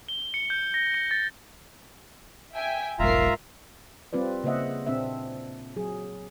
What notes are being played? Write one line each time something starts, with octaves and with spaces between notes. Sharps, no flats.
G7
C#7
G6
A#6
C#7
A6
E5 G5 G#5
F1 B1 G#2 F4 A#4 E5 A#5 C7
G3 C4 F4 B4 D5
C#3 A#3 C5 D#5 E5 F#5
A#2 C4 D4 E5
F#3 G#4